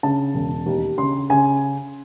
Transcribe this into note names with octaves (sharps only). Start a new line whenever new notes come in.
C#3 A5
E1
D#2
C#3 C6
C#3 G#5